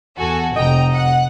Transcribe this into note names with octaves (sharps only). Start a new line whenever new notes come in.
E2 F#4 A4 G#5
F1 D#5 G5 A#5
F#5